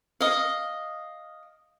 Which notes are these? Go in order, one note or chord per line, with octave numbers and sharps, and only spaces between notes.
D#5 F5